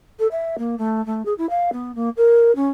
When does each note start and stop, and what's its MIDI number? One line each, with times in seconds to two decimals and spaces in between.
0.19 0.27 69
0.31 0.56 76
0.58 0.75 58
0.78 1.04 57
1.06 1.22 57
1.25 1.33 68
1.38 1.48 64
1.49 1.70 77
1.72 1.94 59
1.95 2.09 58
2.17 2.54 70
2.55 2.69 61